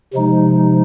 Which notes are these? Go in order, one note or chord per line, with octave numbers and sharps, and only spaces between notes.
C3 F3 G#3 D#4